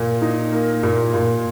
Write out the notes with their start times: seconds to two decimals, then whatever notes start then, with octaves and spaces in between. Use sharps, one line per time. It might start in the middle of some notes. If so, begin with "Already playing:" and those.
Already playing: A#2
0.22 D#4
0.52 A#3
0.83 A#2
1.14 A#2